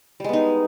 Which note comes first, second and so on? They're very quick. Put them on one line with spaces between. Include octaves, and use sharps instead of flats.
G3 G#3 B3 D#4